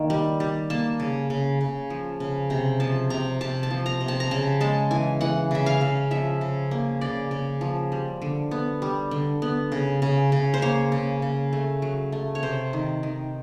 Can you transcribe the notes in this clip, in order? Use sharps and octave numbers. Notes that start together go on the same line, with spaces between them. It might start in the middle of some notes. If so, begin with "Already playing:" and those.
Already playing: D#3 A#3
G3
G3
A#3 A5
C#3
C#3
C#3
F3
C#3
C3 A#5
F3 A5
C3 A#5
C3 A5
A5
F3
A#5
C3
A5
A#5
C#3 A5
G#3 A5
E3 G#5
E3 F#5
C#3 E5
F5
C#3
F3 E5
C#3
A#3
C#3 D5
C#3
F3
G3
D3
B3
G3
D3
B3
C#3
C#3
C#3
C5
A#3 C#5
C#3
C#3
A3
F#3
A3
C#5
C3 C5
D#3
D#3